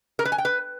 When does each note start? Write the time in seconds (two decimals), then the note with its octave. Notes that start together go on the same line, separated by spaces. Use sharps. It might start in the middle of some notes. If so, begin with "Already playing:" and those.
0.19 A#4
0.25 B4
0.32 G#5
0.38 G5
0.45 B4